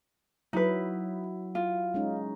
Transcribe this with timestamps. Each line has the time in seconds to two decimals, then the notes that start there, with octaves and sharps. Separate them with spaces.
0.53 F#3 D#4 E4 B4
1.55 F4
1.94 G#3 C#4 D#4